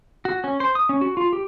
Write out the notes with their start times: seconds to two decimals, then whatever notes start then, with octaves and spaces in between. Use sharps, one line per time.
0.25 F#4
0.44 C#4
0.60 C5
0.75 D#6
0.89 C#4
1.01 F#4
1.17 F4
1.33 G4